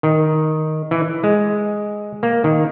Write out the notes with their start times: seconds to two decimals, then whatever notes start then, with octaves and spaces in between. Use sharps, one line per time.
0.03 D#3
0.91 E3
1.24 G#3
2.23 A#3
2.44 D#3